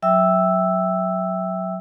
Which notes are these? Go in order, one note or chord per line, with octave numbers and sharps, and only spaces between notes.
F#3 E5 G5 E6